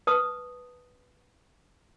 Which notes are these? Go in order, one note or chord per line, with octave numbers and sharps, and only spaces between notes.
B4 A5 D#6